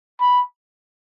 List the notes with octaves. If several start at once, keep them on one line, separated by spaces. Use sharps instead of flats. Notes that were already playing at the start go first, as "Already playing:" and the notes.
B5